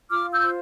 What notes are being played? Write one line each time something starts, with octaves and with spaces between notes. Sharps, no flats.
F4 D6 F6
E6 G6
C5